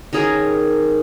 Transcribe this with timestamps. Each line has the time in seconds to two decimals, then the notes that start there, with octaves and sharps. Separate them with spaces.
0.13 D#3 C#4 G#4 A#4